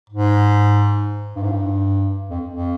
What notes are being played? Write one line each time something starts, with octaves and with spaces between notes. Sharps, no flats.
G#2
G2
G#2
G2
F2
F2